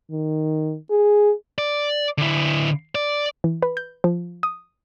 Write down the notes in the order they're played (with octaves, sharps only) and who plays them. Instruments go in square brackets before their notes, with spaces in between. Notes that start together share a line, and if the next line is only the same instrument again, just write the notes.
[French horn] D#3
G#4
[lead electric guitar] D5
D3 E4
D5
[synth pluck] E3
B4
G6
F3
D#6